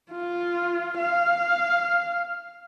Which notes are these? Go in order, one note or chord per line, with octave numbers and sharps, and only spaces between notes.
F4
F5